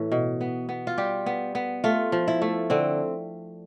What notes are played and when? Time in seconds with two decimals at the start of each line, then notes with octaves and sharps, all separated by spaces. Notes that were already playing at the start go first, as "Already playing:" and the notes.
Already playing: A2 E3
0.12 B2
0.41 B3
0.69 B3
0.87 F4
0.98 G3 G4
1.26 B3
1.55 B3
1.84 A3 F4
2.12 F3
2.28 E4
2.42 A3
2.70 D3 C4